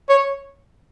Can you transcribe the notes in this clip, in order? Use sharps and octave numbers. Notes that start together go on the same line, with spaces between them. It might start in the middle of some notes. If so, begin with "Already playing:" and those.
C#5